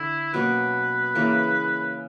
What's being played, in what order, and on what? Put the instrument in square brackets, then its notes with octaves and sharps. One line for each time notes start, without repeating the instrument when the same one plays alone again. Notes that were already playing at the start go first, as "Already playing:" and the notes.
Already playing: [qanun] D3 D4 [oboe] E4
[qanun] B2 F#3 A#3 C#4 [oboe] B4
[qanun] C#3 E3 A#3